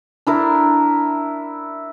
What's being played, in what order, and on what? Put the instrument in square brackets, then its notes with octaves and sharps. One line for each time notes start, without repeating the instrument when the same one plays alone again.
[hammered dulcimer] D4 E4 A#4